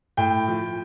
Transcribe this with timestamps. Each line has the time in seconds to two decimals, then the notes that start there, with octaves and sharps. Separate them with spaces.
0.17 A2 G5
0.48 F3